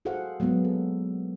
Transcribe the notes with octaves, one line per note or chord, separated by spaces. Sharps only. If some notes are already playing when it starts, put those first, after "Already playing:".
F#4 G#4 A4 C5 F5 F#5
F#3 G#3 A#3 B3
A4